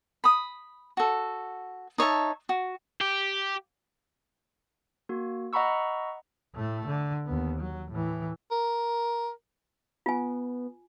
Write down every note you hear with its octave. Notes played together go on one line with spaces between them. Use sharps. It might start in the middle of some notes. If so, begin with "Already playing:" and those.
B5 D#6
F#4 A4
D#4 C#5 E5 A5
F#4
G4
A#3 F#4
D#5 F#5 A#5 B5 C#6 E6
A2 A3
D3
D#2 B3
F#3
A2 E3
A#4
B3 F4 G#5